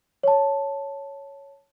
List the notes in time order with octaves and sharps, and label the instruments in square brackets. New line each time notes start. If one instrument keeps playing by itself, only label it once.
[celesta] C#5 A5